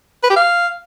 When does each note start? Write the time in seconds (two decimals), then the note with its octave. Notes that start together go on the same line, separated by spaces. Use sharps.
0.23 B4
0.30 G4
0.36 F5